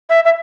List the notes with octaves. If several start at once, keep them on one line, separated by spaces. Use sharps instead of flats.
E5
E5